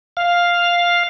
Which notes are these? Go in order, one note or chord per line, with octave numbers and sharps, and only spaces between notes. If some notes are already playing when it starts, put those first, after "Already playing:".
F5